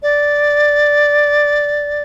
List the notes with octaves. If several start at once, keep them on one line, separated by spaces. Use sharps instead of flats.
D5